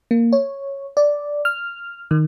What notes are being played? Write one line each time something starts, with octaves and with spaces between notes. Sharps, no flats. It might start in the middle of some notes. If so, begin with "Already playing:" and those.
A#3
C#5
D5
F6
D#3